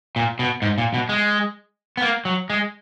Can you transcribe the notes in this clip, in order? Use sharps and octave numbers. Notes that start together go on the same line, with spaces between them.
A#2
B2
G#2
A#2
B2
G#3
B3
A#3
F#3
G#3